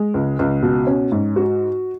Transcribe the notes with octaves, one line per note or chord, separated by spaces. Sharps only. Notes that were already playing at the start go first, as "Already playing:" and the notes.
Already playing: G#3
C#2
C#2
B2
C#4
G#2
F#4